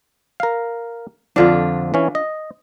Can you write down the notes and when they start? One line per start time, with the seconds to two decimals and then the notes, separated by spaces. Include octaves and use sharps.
0.40 A#4 F5
1.36 F2 D3 F3 D4 F4
1.94 E3 C#4
2.15 D#5